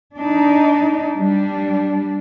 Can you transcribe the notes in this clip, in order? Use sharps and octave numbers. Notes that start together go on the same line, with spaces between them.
D4 D#4
G3 D4